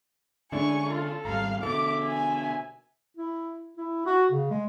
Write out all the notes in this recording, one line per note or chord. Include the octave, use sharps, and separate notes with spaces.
D3 G#3 C#4 D4 E4 G#5 C#6
F4 A4
G#1 G3 F5 A#5
B2 D3 A4 E5 D6
G#5
E4
E4
F#4
C#3
G#3